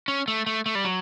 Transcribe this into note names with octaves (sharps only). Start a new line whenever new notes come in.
C#4
A3
A3
A3
G3
F#3